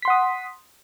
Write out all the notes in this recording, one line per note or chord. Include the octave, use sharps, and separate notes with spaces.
F#5 C6 D#6 B6